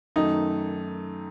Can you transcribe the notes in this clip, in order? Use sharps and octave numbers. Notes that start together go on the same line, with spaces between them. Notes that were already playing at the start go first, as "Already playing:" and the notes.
F#2 D#3 A3 D#4